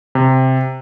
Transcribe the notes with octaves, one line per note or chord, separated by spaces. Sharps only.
C3